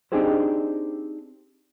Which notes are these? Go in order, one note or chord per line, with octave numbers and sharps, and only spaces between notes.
C4 D4 D#4 G4 G#4 C5